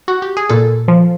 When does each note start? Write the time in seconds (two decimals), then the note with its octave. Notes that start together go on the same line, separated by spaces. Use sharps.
0.08 F#4
0.22 G4
0.37 G#4
0.50 A#2 A4
0.88 F3